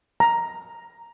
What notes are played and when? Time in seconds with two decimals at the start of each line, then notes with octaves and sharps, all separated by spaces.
0.20 A#5